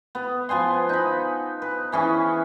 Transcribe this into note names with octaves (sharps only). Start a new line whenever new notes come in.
B3
F3 B3 G#5 C6
D#4 B5
B4
E3 C#4 G#4